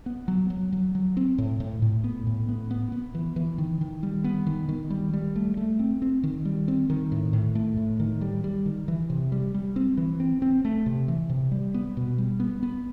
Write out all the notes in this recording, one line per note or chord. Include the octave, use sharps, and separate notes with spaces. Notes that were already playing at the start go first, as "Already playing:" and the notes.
B3
F#3
F#3
F#3
F#3
C4
A2
A2
A2
B3
A2
B3
B3
B3
E3
E3
D#3
D#3
G3
B3
D#3
D#3
G3
G3
A3
A3
C4
C4
D#3
G3
C4
D#3
A2
A2
A3
A2
D#3
G3
G3
D#3
E3
C3
G3
G3
C4
E3
C4
C4
A3
C3
E3
C3
G3
B3
B2
G3
B3
B3